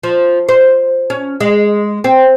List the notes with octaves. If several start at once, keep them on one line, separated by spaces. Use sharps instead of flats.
F3
C5
C#4
G#3
C4